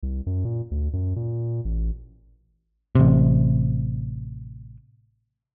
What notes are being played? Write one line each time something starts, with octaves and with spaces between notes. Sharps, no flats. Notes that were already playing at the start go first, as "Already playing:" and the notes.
C2
F#2
A#2
D2
F#2
A#2
A1
A1 C3